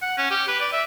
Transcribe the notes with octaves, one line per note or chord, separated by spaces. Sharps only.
F#5
C#4
G4
B4
D5
E5